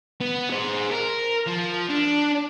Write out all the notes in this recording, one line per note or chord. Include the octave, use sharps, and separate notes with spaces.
B3
G#4 C5
A#4
F3
D4